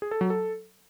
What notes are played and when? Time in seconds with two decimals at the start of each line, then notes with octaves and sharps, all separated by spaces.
0.02 G#4
0.11 A4
0.21 F#3
0.30 A4